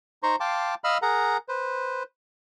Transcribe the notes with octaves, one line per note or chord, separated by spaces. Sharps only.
D#4 C5 A#5 C6 C#6
F5 G5 A5 C6 D6
D#5 F5 B5 E6 F6
G#4 A#4 F#5 A#5
B4 C5